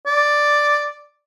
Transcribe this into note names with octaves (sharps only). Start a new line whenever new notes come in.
D5